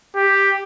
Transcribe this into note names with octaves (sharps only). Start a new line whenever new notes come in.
G4